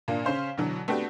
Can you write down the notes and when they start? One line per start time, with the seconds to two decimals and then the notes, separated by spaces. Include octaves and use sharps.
0.08 A#2 A#3 D4
0.25 C#3 C#4 C5 F5
0.57 B2 D3 E3 F#3
0.88 A3 B3 C4 D4 F#4 G4